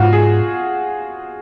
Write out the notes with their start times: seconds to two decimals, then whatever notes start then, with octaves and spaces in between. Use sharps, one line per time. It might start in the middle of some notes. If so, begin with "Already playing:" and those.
Already playing: G#2 F4 F#4
0.13 G#4